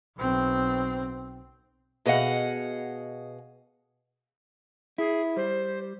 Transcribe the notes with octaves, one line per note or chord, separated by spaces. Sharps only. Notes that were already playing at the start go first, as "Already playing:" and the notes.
B1 C4
B2 G#4 D#5 F5 F#5
E4 G#4
G3 C5